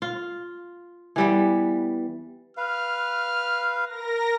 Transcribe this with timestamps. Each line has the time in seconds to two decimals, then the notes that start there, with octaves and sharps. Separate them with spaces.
0.02 F4
1.16 E3 G3 B3
2.57 B4 F5 F6
3.84 A#4 A#6